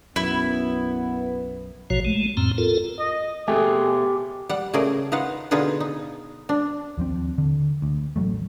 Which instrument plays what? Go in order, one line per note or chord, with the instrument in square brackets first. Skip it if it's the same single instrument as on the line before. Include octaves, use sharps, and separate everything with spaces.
[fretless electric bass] B1 F#2 [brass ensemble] B3 [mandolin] E4
[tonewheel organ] A#1 B2 F3 F#4 C#5
G#3 A3
F2 A2 C4 A#5
F4 A4 A#4
[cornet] D#5
[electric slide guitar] B2 G5 G#5 [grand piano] A3 [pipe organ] G4 [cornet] G#4
[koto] G3 F#5
C#3 A3 G#4 A#4 D5
D#4 F4 B4 F5 F#5
B2 D3 D#4 F4 G#4 B4
D#4
D4
[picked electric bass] D#2 F3 C4
D3
D2
A1 C3 F#3 A3